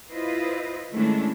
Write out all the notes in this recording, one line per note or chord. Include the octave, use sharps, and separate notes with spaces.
E4 F4 B4 C5 D#5
D#3 G#3 A3 C#4 D4 E4